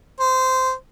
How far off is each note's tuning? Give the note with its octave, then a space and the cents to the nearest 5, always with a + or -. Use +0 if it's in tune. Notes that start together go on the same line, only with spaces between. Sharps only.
C5 -15